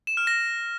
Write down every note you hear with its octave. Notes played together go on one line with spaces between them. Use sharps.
E7
F6
A#6